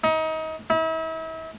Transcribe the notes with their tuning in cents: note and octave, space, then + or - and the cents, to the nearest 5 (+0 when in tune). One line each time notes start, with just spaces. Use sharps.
D#4 +30
E4 -40